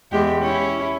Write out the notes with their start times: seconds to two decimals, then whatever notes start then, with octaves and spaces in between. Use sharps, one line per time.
0.12 E2 G#3 G4
0.41 C#4 E4